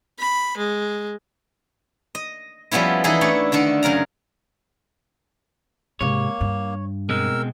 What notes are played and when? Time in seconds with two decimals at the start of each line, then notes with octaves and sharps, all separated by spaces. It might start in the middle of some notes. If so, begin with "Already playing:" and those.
0.19 B5
0.57 G#3
2.15 D#5
2.71 F3 G3 B3 C#4 E4
3.04 E3 D#4 E4 G#4 A4
3.21 A3 D4 C#5
3.52 D3 D#3 D4 A4
3.83 F#2 C#3 A#4 A#5
6.01 G#2 C3 A#3 C#5
6.41 G2
7.09 B2 G#3 C4 A#4 E6